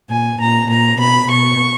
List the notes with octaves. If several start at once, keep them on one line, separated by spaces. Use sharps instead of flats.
A#2 G#5
A#2 A#5
A#2 A#5
B2 B5
B2 C#6